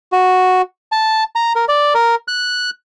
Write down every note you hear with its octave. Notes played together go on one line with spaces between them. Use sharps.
F#4
A5
A#5
A#4
D5
A#4
F#6